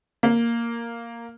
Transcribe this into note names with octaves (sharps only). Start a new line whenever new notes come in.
A#3